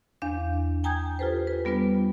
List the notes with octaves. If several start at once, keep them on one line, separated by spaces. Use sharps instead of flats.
E2 D4 F5 G6
G5 G#5 A#5 D#6 G6 G#6
F4 G4 A4 B4 C5
B4
G3 B3 D4 F4 B4